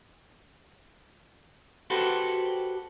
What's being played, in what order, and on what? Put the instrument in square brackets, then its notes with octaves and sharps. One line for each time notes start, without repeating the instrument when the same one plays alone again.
[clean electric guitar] F#4 G4 A4 B4 C5